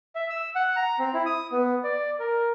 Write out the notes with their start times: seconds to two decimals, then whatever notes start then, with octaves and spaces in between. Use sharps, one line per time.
0.15 E5
0.30 E6
0.55 F#5
0.76 A#5
0.99 C4
1.14 E4
1.26 D#6
1.52 B3
1.84 D5
2.20 A#4